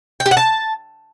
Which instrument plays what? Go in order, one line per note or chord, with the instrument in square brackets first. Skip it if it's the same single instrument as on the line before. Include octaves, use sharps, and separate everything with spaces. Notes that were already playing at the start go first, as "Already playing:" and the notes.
[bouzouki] G5
G4
F#5
A5